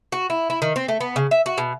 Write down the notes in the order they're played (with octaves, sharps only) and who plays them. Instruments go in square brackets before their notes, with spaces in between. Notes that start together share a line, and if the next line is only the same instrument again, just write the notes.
[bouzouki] F#4
E4
E4
D#3
C4
A3
B3
C#3
E5
F#4
B2